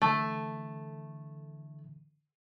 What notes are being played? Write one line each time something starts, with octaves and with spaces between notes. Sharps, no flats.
D3 E3 A3